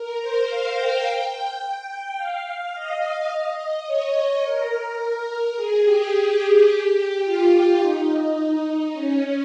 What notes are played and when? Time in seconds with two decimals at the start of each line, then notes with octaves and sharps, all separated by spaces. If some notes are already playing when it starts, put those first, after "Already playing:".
Already playing: A#4
0.22 C5
0.49 F5
0.78 G5
1.62 G5
1.90 G5
2.18 F5
2.75 D#5
3.31 D#5
3.87 C#5
4.43 A#4
5.56 G#4
5.84 G4
7.25 F4
7.81 D#4
8.93 C#4